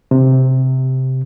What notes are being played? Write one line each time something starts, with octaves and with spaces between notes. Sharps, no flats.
C3